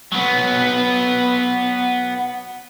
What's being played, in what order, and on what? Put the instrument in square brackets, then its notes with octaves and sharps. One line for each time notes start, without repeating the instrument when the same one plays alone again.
[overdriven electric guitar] F#3 B3